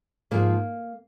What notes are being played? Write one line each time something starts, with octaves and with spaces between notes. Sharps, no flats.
G#2 F3 G#3 A#3